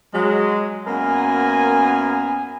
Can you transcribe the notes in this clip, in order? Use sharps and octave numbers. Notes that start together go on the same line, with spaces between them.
F#3 G#3
F#2 A#3 B3 A#4 G#5